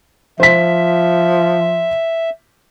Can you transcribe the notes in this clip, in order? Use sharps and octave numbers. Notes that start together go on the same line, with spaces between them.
F3 C5 E5 B6